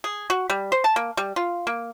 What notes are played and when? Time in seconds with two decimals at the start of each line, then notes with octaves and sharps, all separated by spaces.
0.04 G#4
0.30 F#4
0.50 G3
0.72 C5
0.84 A5
0.96 A#3
1.17 G3
1.36 F4
1.67 A#3